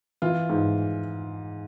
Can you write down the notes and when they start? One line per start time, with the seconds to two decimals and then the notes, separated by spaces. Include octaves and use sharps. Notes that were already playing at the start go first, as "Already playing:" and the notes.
0.22 E3 F4
0.49 G#2